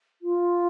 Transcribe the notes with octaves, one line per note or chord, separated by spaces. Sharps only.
F4